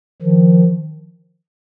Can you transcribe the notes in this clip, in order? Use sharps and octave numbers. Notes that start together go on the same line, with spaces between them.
D#3 F3